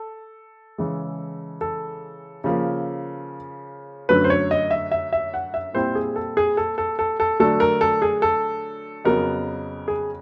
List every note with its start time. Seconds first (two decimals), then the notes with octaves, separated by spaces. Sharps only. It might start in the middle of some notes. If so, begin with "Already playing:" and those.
Already playing: A4
0.78 C#3 E3 G#3
1.61 A4
2.44 C#3 F3 A#3
4.09 F#2 D3 F#3 A3 C#4 B4
4.24 C5
4.30 C#5
4.51 D#5
4.71 E5
4.92 E5
5.13 E5
5.34 F#5
5.54 E5
5.74 A#2 G3 C4 E4 C5
5.95 G#4
6.16 A4
6.37 G#4
6.57 A4
6.78 A4
6.99 A4
7.20 A4
7.40 D3 F#3 A3 D4 A4
7.60 A#4
7.81 A4
8.02 G#4
8.22 A4
9.05 F2 C#3 F#3 B3 A#4
9.88 G#4